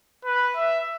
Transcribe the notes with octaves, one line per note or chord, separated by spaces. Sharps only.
B4
E5